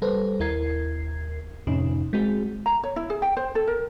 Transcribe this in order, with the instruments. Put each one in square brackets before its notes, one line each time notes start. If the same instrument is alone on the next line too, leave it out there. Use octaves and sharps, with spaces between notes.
[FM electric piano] G3 A4 B4 C5
D#2 E4 A#4 G#6 C7
F2 A2 C3 C#4 D#4
G#3 C4 F#4 G#4
[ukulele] A#5
C#5
E4
G#4
G5
C5
A4
A#4